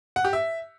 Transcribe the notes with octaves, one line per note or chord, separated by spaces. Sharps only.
F#5
G4
E5